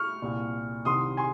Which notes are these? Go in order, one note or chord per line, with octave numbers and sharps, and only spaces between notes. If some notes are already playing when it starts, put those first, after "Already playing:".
Already playing: C#6 F6
C2 A#2
C2 C3 D#3 C6 D#6
G#5 C6